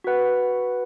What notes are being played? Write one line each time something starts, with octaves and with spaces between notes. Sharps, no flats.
F#4 B4 F#5